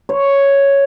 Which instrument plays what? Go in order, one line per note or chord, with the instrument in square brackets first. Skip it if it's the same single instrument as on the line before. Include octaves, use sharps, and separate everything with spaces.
[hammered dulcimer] C#5